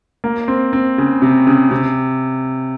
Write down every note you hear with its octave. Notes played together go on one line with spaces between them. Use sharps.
A#3
C4
C4
C#3
C3
C#3
C3